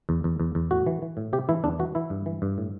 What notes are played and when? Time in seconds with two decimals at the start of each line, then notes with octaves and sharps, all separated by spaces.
0.09 E2
0.24 E2
0.40 E2
0.55 E2
0.71 A2 F#4
0.86 E3
1.02 E3
1.17 A2
1.33 C3 G4
1.49 E3 E4
1.64 E2 D4
1.79 E3 F#4
1.95 E3 E4
2.10 G2
2.26 E3
2.42 G2
2.58 A2